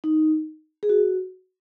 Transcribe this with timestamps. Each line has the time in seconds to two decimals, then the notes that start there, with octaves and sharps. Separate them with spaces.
0.04 D#4
0.83 G#4
0.89 F#4